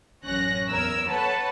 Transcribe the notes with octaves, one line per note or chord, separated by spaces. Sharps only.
A1 F#2 C#4 C#5 F#6 A#6
E2 A#4 E6 G#6
A4 B4 C#5 F#5 A5